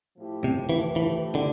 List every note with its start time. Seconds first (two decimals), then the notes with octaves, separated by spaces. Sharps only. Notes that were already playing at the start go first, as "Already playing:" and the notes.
0.18 A2 F3 A3 E4 G4
0.44 C3
0.69 E3
0.96 E3
1.35 D3